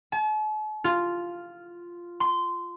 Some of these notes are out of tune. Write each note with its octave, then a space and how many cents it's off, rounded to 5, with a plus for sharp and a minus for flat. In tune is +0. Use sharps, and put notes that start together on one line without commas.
A5 -45
F4 -5
C6 -15